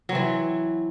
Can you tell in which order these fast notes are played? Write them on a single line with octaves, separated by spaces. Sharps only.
F#3 C4 E3